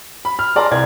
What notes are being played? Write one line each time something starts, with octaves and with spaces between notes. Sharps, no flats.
B5
F6
G#4 D5 A5 A#5 C6 F6
C2 D5 G#6